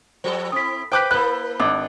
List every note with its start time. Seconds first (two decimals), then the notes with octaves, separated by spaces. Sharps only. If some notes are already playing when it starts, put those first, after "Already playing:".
0.24 F3 G3 A4 C5
0.52 C4 E4 D#6 B6
0.92 B4 C5 G5 D6 F#6 G6 B6
1.11 A#3 E4 A4 B4 F#6
1.60 G#1 D4